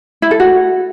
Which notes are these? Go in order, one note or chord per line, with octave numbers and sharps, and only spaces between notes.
E4
A4
F#4